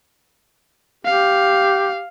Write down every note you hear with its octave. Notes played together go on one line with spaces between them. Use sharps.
G4 F5